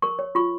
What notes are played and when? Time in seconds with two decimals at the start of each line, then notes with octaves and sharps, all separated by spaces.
0.02 A#4 C#6
0.19 C#5
0.35 F4 C#6